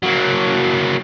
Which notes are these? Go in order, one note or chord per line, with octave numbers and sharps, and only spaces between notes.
F#3 A#3